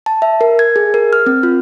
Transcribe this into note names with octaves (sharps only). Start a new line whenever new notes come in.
A5
E5
A#4
G#6
G#4
A#4
F6
C4
F4